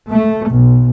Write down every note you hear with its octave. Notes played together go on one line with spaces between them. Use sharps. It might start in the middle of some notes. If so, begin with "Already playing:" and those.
A3
B1